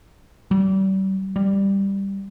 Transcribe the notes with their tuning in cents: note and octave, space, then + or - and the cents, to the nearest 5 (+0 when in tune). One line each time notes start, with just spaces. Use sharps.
G3 -35
G3 +5